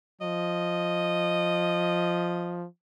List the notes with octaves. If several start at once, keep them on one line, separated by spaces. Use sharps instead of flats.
F3 D#5